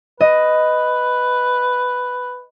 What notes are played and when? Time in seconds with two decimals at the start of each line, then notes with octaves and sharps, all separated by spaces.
0.21 B4 D#5